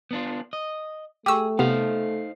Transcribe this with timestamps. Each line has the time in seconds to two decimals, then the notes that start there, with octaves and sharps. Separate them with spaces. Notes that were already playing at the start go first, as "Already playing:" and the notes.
0.11 B3 D4 F4
0.53 D#5
1.26 A3 G4 G#4 G5 C#6 E6
1.59 C3 B3 D#4 C5 F5